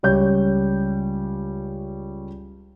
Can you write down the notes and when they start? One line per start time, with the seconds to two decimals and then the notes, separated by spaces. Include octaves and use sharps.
0.03 C#2 G3 C#5 G6